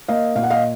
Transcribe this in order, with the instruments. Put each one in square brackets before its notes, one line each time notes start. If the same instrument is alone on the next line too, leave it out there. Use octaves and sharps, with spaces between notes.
[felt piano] A#3 D#5 F5
A#2 F5
F#5
D#5 F5